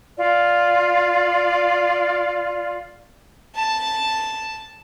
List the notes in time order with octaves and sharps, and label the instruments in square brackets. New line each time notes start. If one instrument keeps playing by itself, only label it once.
[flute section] F4 D5
[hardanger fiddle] A5